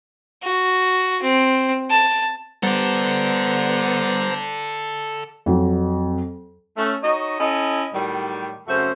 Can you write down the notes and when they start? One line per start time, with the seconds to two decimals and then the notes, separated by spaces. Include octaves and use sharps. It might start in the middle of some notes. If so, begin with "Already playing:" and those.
0.43 F#4
1.22 C4
1.90 A5
2.63 G3 B3 A4 C5 D5 A#5
5.46 F2 F#3
6.77 A3 C#4
7.03 D#4 F#4 C#5 D#5
7.39 C#4 E4 A4 D#5
7.93 A2 D#3 F#3 G3
8.68 F#2 C#3 A3 C4 F#4 C5